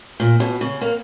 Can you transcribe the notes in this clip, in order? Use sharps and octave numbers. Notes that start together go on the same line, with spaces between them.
A#2
B2
C#3
A#3